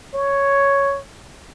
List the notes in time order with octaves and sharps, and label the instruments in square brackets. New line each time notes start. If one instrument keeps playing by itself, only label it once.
[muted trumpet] C#5